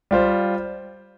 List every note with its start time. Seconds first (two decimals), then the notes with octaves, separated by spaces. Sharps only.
0.11 G3 F4 C5